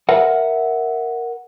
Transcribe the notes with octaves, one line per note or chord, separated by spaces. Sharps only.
A#4 E5 F#5